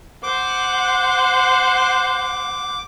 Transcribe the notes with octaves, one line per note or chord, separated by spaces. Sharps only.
C5 F#5 D6